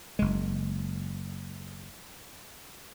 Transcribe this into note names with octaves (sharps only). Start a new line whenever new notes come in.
F#1 G#3